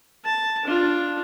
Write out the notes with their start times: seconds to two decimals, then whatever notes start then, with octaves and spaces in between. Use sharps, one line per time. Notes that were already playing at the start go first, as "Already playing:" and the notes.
0.25 A5
0.64 D4 F4